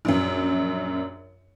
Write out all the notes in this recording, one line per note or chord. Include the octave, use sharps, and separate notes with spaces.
A#1 F#2